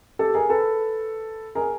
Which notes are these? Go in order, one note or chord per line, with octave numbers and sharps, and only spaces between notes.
G4 A4
G#4 A#4
A4 B4
G#4 A#4